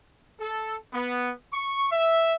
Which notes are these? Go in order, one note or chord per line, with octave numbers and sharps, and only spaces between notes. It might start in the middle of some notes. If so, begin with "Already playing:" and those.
A4
B3
C#6
E5